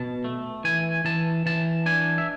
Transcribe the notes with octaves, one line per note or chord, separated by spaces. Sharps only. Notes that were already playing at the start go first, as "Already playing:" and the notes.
Already playing: B2 A5
A3
E3 G#5
E3 A5
E3 A5
D4 G#5
E5